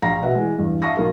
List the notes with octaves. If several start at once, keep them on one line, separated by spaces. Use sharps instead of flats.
A#1 F5 A#5 A#6
B2 B4 E5 F#5
E3 G#3
E2 G2
E5 F5 A5 C#6 D#6 A#6
B1 D#4 A#4 F5